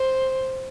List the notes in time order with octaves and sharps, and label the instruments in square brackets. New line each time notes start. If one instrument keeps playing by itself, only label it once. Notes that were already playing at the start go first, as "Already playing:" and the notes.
Already playing: [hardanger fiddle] C5